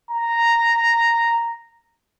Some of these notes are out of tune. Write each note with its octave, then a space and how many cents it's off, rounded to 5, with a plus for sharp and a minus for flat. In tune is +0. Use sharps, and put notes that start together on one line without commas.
A#5 -5